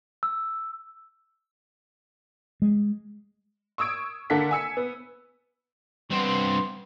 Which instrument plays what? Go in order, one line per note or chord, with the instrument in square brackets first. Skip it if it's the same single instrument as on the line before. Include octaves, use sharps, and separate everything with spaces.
[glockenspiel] E6
[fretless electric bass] G#3
[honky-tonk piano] C#6 D#6 E6 G#6 D7
D3 A#3 A4 F#5 B6
G#5 E6 C#7
B3
[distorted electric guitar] G2 C4 [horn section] B3 C6